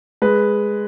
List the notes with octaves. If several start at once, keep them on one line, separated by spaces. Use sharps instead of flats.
G#3 B4